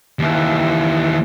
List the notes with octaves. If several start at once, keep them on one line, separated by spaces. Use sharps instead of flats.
D#2 E3